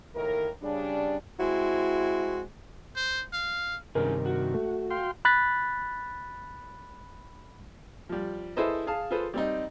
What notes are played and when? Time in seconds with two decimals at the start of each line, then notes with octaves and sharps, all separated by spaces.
0.14 D#2 A2 D#3 A#4
0.62 C#3 G3 D4
1.40 G#3 C4 E4 F#4
2.96 C5
3.33 F5
3.95 G2 C3 D#3 C#4 D#4 G#4 A#4
4.26 F#4
4.54 A3
4.90 F5 G5 C6
5.25 B5 F#6 A6 B6
8.09 F3 G3
8.56 E4 G#4 A4 B4 C5 D#5
8.87 G#4 F5 A5
9.11 F4 G#4 A4 B4 C5
9.34 G3 C4 D#4